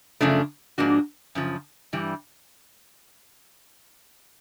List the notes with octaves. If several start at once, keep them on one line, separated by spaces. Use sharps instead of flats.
F#2 C#3 F3 A3 D4
G#2 F3 A#3 D4 F#4
F#2 C#3 F3
G2 E3 G3